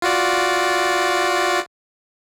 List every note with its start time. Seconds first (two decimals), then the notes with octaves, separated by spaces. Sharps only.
0.02 F4 F#4 D5